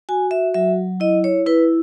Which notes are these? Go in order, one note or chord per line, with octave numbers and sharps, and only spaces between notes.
F#4 G#5
E5
F#3 E5
E4 D#5
C#5
E4 B4